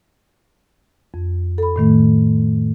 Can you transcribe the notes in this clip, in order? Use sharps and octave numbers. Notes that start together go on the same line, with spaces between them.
F2
A4 B5
A2 D#3 A3